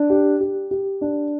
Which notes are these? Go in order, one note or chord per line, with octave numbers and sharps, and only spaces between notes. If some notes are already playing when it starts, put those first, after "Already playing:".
Already playing: D4
G4
G4
G4
D4